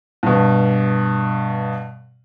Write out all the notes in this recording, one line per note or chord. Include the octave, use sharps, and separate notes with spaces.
G2 B2